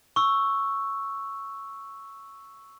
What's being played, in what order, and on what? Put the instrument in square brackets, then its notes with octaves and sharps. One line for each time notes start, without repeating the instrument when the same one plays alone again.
[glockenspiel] C#6 E6